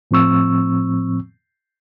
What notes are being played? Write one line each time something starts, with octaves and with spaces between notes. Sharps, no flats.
A2 F3 C4 C#6 E6